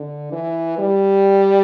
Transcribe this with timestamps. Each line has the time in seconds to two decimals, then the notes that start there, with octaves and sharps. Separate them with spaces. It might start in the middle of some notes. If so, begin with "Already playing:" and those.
Already playing: D3
0.32 E3
0.78 G3